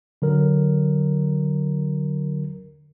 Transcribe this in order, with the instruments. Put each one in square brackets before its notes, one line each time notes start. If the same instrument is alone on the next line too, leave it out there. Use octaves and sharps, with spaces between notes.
[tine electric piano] D3 F#3 A#4